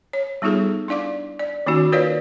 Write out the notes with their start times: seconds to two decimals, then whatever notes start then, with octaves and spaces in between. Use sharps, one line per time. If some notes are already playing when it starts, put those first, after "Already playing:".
0.13 C#5
0.42 G3 B3 D#4 F4 G#4 A4
0.88 D4 E4 D5 F5 D6
1.39 D5
1.67 D#3 A#3 C#4 D#4 F#4
1.92 F4 A#4 B4 C#5 D5 F5